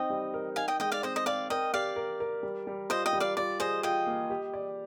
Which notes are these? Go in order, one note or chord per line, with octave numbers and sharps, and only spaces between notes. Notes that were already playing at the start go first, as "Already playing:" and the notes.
Already playing: C4 D#4 D#5 G5
G3
A#4
D#4 F5 G#5
D#5 G5
G#3 D#5 G5
D5 F5
C4 C5 D#5
D#5
C4 D5 F5
A#4 D#5 G5
G4 D5 F5
A#4
A#4
G3
G3
F4 C5 D#5
D#5 G5
G3
D5 F5
F4 D5
G#4 C5 D#5
F4 D#5 G5
A#3
G4
D5